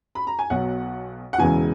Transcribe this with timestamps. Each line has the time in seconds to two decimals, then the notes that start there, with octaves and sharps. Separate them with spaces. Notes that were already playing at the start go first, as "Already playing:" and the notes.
0.15 B5
0.27 A#5
0.39 G#5
0.50 B1 B2 F#3 F#5
1.33 F#5
1.38 E1 E2 C#3 E3 G#5